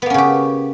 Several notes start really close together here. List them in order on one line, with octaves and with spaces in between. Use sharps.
B3 A#3 C#4 C#3 G4